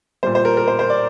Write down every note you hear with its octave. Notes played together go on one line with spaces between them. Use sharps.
A#2 G3 C5
C5
A#4
A#4
C5
C5
D5